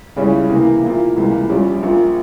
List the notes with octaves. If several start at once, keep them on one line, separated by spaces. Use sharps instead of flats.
C#2 C#3 G3 C#4 E4
C3 E3 A#3
A#2 F3 A#3 E4
C#2 C3 E3 G3 A#3
A#1 A#2 G3 C#4 G4
A#1 A#2 F3 A#3